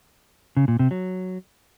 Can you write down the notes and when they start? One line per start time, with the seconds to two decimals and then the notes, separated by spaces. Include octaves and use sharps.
0.57 C#3
0.68 A#2
0.79 C3
0.91 F#3